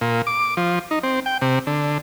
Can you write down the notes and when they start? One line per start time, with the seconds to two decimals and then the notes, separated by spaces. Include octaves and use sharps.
0.01 A#2
0.27 D6
0.57 F3
0.91 D#4
1.03 C4
1.26 G5
1.42 C3
1.67 D3